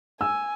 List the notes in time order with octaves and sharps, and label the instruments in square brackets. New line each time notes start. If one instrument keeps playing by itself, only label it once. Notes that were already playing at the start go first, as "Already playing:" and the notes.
[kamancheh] G#5 [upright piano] E6